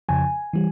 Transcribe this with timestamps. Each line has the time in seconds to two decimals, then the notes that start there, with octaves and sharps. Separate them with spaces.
0.09 F2 C#3 F3 G#5
0.53 E3 G3